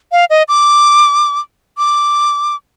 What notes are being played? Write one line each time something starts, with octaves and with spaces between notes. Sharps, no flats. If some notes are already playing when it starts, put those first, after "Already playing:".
F5
D#5
D6
D6